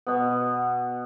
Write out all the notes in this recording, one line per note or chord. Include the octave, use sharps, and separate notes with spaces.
B2 B3